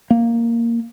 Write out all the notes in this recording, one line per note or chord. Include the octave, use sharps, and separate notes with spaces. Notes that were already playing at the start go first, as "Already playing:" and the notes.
A#3